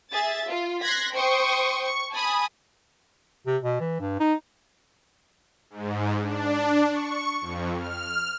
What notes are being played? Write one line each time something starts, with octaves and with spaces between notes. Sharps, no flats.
G#4 E5 A6
F4
C6 F#6 G#6 A#6 B6
C5 G5 C6 C#6 D#6
C#6
G#5 A5 B5 D#6
C3
B2
E3
G2
D#4
G#2
D4
C#6
F2
F6